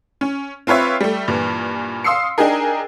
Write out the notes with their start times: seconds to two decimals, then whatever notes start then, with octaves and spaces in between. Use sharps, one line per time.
0.21 C#4
0.67 C4 F4 B4 C#5 E5
1.01 G3 A3
1.28 G2 A#2 E3
2.04 F5 C6 D#6 E6 C7 C#7
2.38 D4 D#4 G4 G#4 A#4